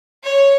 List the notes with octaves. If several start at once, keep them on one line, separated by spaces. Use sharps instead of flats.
C#5